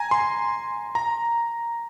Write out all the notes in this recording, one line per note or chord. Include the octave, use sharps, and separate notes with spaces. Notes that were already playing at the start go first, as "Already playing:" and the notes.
Already playing: G#5 A#5
C6
A#5